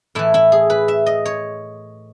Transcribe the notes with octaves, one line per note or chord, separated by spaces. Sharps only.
A2 E3 E4
E4
G#4
B4
E5
D#5
C#5